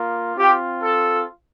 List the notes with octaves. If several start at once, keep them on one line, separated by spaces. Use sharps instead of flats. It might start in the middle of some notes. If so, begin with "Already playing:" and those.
Already playing: A#3 F4
C4 F4 G4
A4